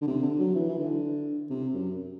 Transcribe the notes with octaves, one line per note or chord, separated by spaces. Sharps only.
D3
C3
D3
F#3
E3
E3
D3
C3
F#2